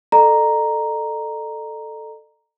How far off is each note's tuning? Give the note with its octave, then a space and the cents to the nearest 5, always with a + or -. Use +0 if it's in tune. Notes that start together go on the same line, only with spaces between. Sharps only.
A4 +0 D5 +45 A#5 +0